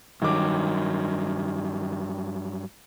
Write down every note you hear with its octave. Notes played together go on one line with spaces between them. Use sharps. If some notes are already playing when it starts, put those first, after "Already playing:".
G2 D#3 F#3 D6